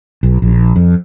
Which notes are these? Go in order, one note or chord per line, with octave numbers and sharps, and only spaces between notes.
B1
A#1
F2